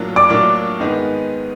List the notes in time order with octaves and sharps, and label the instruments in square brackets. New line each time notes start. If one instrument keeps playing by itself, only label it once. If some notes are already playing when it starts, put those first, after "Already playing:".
Already playing: [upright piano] A2 F#3 A#3 D4 F4
[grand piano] D5 D6
[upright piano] A2 F#3 A#3 D4 F4
G#2 D#3 G#3 B3 D#4